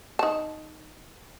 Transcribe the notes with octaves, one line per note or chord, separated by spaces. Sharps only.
D#4 A5